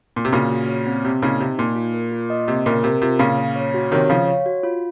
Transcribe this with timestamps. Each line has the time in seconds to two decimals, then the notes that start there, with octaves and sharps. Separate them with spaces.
0.16 A#2
0.25 C3
0.32 A#2 C#3 F#4
0.51 F#4
0.68 C#5
0.87 C4
1.04 C3 C4
1.22 A#2 C#3 D#4
1.40 C3 D#4
1.58 A#2 D#4
1.76 F4
1.94 A#4
2.12 F4
2.30 D#5
2.48 C3 A#3
2.66 A#2 C#3 A#4
2.84 C3 A#4
3.01 C3 F4
3.19 A#2 C#3 F5
3.37 C#5
3.56 C#5
3.74 F#4
3.92 C3 D#3 C#5
4.09 C#3 F3 F5
4.27 C#5
4.46 F#4
4.63 F4